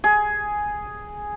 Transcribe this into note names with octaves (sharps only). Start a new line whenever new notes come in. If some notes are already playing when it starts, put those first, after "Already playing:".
G#4